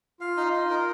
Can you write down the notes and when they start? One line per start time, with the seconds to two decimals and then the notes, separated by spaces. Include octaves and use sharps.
0.20 F4 F5
0.37 D#4
0.53 D#4
0.70 A#4